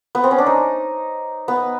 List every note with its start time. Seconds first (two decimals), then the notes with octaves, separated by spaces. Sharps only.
0.15 B3
0.24 C4
0.31 C#4
0.38 D4
0.46 D#4
1.48 B3